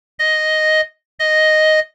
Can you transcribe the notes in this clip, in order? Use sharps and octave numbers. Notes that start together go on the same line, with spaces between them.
D#5
D#5